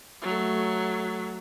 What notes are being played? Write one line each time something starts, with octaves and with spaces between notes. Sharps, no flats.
F#3 A3